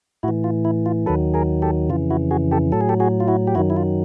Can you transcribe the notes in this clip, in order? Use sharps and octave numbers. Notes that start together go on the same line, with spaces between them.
A2 E4 F#4
E3
F4
E4
F4
D#2 D#3 F#3 A4 B4
G#4 A#4
G4 A4
F2 C#3 E3 F4
E4 F#4
F#4 G#4
G4 A4
A2 F#3 A4
G#4
G4 A4
F#4 G#4
F4
E4 F#4
G4
F#2 D#3 F#3 E4 F#4
E4
F4